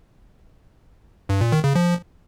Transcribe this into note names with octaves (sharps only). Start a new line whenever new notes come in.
G2
A#2
D#3
C#3
F3